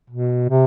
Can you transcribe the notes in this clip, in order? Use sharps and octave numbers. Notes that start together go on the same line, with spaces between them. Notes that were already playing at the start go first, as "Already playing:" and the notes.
B2
C3